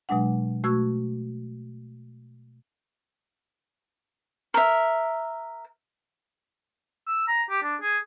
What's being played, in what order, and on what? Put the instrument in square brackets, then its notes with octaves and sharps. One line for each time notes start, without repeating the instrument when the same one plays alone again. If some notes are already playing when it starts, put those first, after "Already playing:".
[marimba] B2 F#3 G#3 D4 F#5
B2 A3 F#4 C#6 E6 G#6
[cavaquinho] A#4 E5
[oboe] E6
A#5
G4
D4
G#4